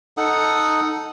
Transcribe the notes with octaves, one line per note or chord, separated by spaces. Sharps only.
D#4 A4 F#5 D#6